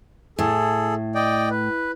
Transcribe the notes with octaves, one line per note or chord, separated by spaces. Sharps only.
A2 G#4 A4
D5 D#5 G5
B4